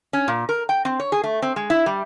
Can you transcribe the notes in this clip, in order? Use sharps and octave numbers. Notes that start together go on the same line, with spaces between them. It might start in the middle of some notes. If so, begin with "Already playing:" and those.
C#4
A#2
A#4
G5
C4
C#5
G#4
A3
C4
G#3
E4
G3